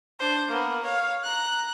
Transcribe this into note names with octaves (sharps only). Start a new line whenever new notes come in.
D4 C5
A#3 B3
C#5 F5
A#5 F#6